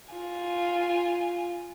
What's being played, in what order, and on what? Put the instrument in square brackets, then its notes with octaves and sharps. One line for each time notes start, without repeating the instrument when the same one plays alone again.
[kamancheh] F4 G#5